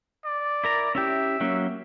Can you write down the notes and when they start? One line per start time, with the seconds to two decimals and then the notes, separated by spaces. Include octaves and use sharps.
0.25 D5
0.64 E4 A#4 A#5
0.95 C#4 E4 G4 E5
1.40 F#3 A#3 C#4